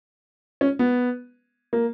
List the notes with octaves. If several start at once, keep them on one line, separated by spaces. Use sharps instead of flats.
C#4
B3
A#3